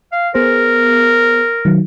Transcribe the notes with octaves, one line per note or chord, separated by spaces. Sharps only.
F5
B3 G#4 A#4 C5
D#3 F#3